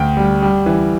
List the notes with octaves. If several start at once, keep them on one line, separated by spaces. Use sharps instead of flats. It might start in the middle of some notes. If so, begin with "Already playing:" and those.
Already playing: D2 G5
G3
G3
E3